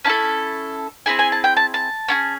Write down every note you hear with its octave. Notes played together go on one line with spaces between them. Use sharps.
C#4 E4 A4 A5
C4 E4 G#4 G#5
G#5
A5
G5
A5
A5
C#4 F4 G#4